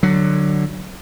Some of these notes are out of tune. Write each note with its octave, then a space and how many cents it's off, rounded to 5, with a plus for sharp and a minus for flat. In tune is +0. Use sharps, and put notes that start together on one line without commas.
D3 +20 F#3 +10